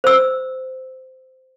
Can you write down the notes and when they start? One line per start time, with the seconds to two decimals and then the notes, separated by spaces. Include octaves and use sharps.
0.04 C5 E6